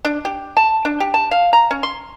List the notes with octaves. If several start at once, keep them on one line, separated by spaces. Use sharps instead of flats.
D4
G4
A5
D4
G4
A5
F5
A#5
C#4
C6